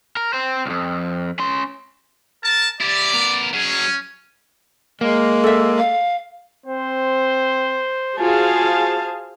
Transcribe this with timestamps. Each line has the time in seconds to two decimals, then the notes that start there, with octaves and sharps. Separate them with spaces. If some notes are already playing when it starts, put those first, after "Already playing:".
0.17 A#4
0.33 C4 C5
0.66 C2 F2
1.39 C#4 C6
2.43 A#4 A5
2.80 E4 G4 D5
3.13 B3 A#4
3.53 F#3 C#4 G#4
5.01 G#3 A#3
5.44 A4 E5
5.78 F5
6.66 C4 C5
8.18 F4 F#4 G#4 C5 F5 G#5 A5